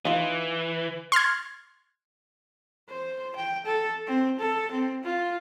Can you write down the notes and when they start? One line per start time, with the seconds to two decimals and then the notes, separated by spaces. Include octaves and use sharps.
0.05 E3 D#4 F4
1.12 C6 F6 F#6 G#6
2.89 C5
3.36 G5
3.66 A4
4.07 C4
4.39 A4
4.71 C4
5.04 F4